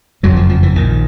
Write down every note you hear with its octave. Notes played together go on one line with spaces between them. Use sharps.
F#1 F2 C#3 F#3
F3
F3
E3
A#1 A#2 D#3